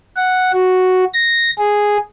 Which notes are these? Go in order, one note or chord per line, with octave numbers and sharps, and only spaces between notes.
F#5
F#4
A#6
G#4